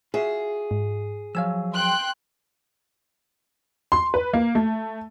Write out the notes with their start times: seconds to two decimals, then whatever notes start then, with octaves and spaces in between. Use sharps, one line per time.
0.14 F4 F#4 G#4 E5
0.71 G#2
1.35 F3 F#3 F5 G#5 E6
1.75 G5 C6 F#6
3.92 C6
4.14 B4
4.33 A#3
4.55 A3